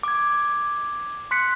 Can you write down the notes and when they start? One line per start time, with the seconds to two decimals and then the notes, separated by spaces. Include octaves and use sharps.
0.03 D6 G#6
1.31 C6 F#6 B6 C#7